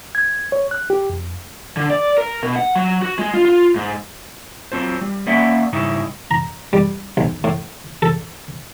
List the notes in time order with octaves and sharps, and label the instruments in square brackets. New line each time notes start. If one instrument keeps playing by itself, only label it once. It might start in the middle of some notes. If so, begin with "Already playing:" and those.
[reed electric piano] G#6
C#5
F#6
G4
F2
[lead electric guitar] D3
D5
A#4
B2
F#5
F#3
F#4
G#3
F4
F4
G#2
[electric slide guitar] F#3 C4 F4 C5
G3
A#3 C#4 D5 E5 F#5
G#2 C#3 G3 D#4 E4
[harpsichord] A#5
G3
B1
A2
A4